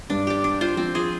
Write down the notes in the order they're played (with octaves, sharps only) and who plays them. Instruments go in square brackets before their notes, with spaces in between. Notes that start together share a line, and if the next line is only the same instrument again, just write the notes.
[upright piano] G2 G3 [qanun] D4
[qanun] G4 D5
D4
F4 C5
[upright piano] F3 [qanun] C4
[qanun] F4 G#4 C5